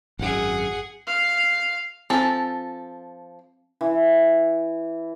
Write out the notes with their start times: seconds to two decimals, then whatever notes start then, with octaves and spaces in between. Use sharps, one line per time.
0.19 G#1 F#2 G#4 F#5
1.07 F5
2.10 F3 C4 A4 G#5
3.81 E3